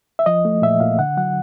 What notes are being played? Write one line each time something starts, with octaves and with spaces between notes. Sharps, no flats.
E5
F3 D#5
A3
A#2 E5
A#2 F5
D3 F#5
F#3 F#5